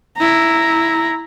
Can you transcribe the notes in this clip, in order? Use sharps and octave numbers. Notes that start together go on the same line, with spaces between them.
E4 A#5